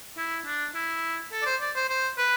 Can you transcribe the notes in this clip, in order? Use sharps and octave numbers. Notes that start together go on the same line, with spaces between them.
E4
D4
E4
A4
D5
C5
D5
C5
C5
B4